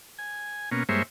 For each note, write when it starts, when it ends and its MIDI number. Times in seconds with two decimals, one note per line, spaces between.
0.19 0.70 80
0.71 0.83 47
0.71 0.83 58
0.71 0.83 61
0.89 1.03 43
0.89 1.03 56
0.89 1.03 58
0.89 1.03 72
0.89 1.03 73
0.89 1.03 76